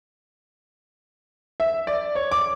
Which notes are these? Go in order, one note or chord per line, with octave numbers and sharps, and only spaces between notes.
E5
D5
C#5
D6